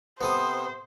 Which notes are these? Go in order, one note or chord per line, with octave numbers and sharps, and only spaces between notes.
C3 B3 A4 C5 D#6